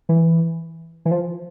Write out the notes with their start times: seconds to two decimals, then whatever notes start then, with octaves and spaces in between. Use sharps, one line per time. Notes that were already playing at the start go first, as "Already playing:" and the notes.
0.09 E3
1.05 E3
1.11 F3